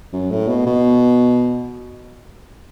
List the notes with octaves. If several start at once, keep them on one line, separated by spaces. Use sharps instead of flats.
F#2
A2
B2
B2